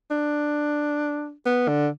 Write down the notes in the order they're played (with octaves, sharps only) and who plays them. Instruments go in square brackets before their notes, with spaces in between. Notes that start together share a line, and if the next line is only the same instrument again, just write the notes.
[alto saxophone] D4
B3
D3